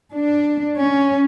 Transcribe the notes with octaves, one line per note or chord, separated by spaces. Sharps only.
D4
C#4